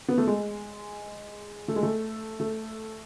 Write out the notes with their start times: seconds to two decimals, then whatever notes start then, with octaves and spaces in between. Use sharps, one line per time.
0.08 B3
0.18 A3
0.27 G#3
1.68 A3
1.76 G#3
1.83 A3
2.40 A3